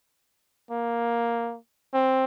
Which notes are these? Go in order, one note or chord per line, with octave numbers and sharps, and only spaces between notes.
A#3
C4